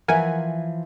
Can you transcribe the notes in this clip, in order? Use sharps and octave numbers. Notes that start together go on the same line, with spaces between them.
E3 F3 A#4 E5 F#5 G#5